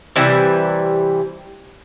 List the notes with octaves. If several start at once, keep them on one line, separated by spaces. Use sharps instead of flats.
C3 E3 G3